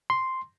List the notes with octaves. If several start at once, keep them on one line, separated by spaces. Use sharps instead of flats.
C6